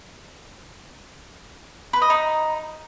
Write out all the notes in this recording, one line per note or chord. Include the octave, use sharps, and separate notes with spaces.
B4
D#5
D#4